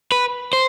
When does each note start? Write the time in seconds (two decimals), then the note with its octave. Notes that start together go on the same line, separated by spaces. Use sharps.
0.12 B4
0.53 C5